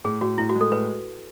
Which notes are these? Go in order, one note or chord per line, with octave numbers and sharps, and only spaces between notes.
A2 G#4
A2 F#4
A2 E4
F#4
G#3
A4
A2 B4